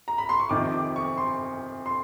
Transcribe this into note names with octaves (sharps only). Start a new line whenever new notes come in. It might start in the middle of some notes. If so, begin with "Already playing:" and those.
A#5
B5
C6
C#6
F2 C3 D#3 D6
D6
C#6
C6
C6